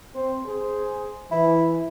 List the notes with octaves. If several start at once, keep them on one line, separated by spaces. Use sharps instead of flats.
C4 C5
G#4 C5
E3 E4